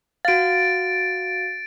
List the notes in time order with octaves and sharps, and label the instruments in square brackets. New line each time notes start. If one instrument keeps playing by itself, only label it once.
[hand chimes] F#4 F5 [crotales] A6 D7